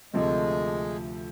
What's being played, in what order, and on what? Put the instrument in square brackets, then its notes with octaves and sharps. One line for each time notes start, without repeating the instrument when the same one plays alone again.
[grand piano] D2 C3 F3 A3 [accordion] G#3